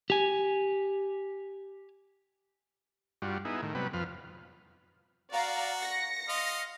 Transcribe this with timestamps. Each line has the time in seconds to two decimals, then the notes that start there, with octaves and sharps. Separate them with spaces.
0.10 G4 G#5
3.22 G2 G3 F4 F#4
3.45 B3 D#4 E4 G#4
3.63 A2 D#3
3.75 C3 F#3 G3 B3 B4
3.93 F2 F3 B4 F6
5.33 F#4 D5 F5 A#5
5.80 A#6 C#7
6.29 D#5 F5 C6